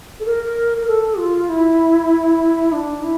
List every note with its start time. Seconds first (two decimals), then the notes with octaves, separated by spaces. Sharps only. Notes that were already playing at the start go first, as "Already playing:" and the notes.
0.20 A4
0.25 A#4
0.78 A#4
0.87 A4
1.18 F4
1.49 E4
2.72 D4
3.03 E4